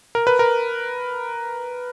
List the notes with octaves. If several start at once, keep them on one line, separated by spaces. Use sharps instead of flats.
A#4
B4
A#4